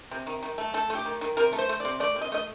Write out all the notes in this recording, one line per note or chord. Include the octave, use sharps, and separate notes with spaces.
C3
D#3
D#3
A3
A3 A4
A3
G4
D#3
D#3
C3 A#4
A3
C5
A3
C3 D5
A3 D5
C3
D#5
A3 D#5